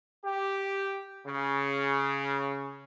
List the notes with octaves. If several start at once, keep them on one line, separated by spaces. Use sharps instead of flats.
G4
C#3